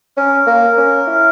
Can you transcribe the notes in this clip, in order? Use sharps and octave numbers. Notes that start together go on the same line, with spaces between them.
C#4 A#4
A#3
C#4
E4